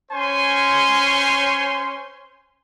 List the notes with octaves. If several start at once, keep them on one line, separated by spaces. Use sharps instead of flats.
C#4 C5 C#5 G#5 C6